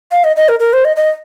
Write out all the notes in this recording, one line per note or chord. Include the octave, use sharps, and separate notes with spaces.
F5
D#5
D#5
A#4
A#4
C5
D#5
D#5